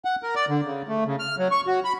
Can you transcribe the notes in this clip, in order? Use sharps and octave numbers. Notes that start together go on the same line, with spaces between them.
F#5
A#4
D5
D3
C#3
A3
C#3
F6
F#3
C#6
F#4
B5